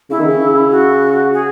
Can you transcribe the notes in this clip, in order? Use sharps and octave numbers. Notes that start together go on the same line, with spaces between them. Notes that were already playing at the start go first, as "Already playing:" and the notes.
C#3 E4
D#3
C#3
F#4
G#4